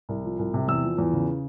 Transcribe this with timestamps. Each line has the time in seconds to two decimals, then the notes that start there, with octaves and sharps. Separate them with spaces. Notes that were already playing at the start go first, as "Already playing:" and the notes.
0.09 C2
0.24 F3
0.39 C2
0.54 C3
0.68 E2 E6
0.84 F3
0.98 E2
1.13 C#3